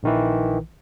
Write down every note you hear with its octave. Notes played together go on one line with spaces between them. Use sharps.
A#1 D#3 E3